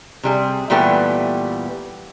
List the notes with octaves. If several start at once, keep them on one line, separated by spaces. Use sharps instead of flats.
C3 G3 G#4
A#2 E3 G3 A3 B3 G4